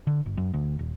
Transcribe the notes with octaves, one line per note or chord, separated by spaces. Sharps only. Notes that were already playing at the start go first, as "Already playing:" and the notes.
D3
G1
F#2
D2
D#1